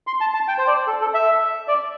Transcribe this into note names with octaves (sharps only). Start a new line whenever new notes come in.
C6
A5
A5
G5
C5
D5
A4
A4
E5
D5